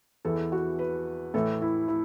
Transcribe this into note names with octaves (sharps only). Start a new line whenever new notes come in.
E2 E3 A4
F#4
B4
A2 E3 A4
E4
E4